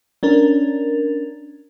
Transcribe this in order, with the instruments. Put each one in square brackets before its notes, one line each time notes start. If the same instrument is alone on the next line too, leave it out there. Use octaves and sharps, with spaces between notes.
[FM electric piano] C#4 D4 A#4